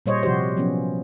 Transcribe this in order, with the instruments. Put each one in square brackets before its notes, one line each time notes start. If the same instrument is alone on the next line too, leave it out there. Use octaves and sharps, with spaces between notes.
[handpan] A#2 G3 C5 C#5 D#5
C3 F3 F#4 G4 C5
F3 F#3 B3 C#4